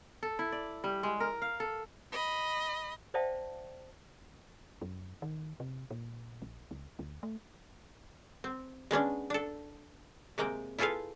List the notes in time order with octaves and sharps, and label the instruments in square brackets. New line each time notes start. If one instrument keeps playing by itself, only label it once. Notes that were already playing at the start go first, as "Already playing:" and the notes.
[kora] A4
E4
D5
G3
G#3
A#4
F5
A4
[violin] D#5 B5
[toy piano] C5 D5 E5 F5 G5 A5
[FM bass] F#2
D#3
C3
A#2
A#1
C#2
D2
A3
[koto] C4
G#3 B3 C#4 D4
D4 A4
C3 G#3 A#3 G5
E4 F4 G#4 A4 B4 F5